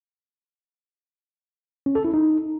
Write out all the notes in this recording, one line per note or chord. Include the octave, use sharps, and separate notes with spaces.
C#4
A4
E4
D#4